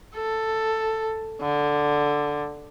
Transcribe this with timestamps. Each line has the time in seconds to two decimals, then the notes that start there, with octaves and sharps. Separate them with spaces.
0.15 A4
1.42 D3